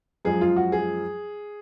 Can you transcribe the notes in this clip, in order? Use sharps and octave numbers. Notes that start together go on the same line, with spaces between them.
F#2 F3 G#3 G#4
F4
F#4
G#4